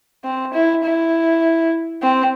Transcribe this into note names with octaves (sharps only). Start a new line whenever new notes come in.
C4
E4
E4
C4